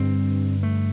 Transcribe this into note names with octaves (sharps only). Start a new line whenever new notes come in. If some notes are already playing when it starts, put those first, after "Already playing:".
Already playing: G2 D3 C4
A3